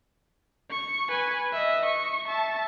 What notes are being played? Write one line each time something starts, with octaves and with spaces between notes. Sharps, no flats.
C#6
B4 G#5
D#5 E5
C#6
E5 A5